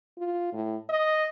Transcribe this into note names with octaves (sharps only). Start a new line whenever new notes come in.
F4
A2
D#5